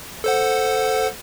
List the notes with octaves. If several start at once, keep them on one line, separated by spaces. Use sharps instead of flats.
A4 C5 F#5